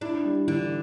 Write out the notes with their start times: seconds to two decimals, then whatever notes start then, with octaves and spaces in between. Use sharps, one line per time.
0.01 D4 E4
0.24 G3
0.47 D3 E3